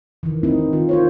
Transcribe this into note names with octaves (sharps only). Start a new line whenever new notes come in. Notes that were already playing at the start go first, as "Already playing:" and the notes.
D#3 E3
C4 D#4 E4
D#3 F4
F4 C5 C#5